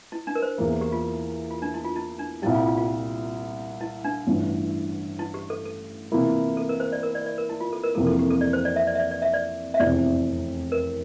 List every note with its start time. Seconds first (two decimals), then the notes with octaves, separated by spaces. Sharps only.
0.12 E4
0.27 D4
0.35 A#4
0.42 C5
0.58 E2 E3 A#3
0.81 G4
0.92 F4
1.51 F4
1.62 D4
1.74 E4
1.85 F4
1.96 E4
2.19 D4
2.42 C2 A#2 G3 E4
2.54 F4
2.66 F4
2.77 F4
3.81 E4
4.04 D4
4.27 A1 G2 E3
5.19 E4
5.34 G4
5.50 A4
5.65 A4
6.12 C3 E3 A#3 E4
6.57 A4
6.69 A#4
6.80 C5
6.92 D5
7.03 A#4
7.15 D5
7.26 D5
7.38 A#4
7.49 E4
7.60 F4
7.73 A4
7.84 A#4
7.95 F2 C3 E3 A#3 A4
8.07 A4
8.19 G4
8.30 A4
8.41 D5
8.53 C5
8.65 D5
8.76 E5
8.87 D5
8.95 E5
8.99 D5
9.11 D5
9.22 E5
9.33 D5
9.74 E5
9.79 F1 E2 C3 E3 D5
10.72 A#4